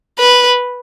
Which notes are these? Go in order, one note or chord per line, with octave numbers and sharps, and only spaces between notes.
B4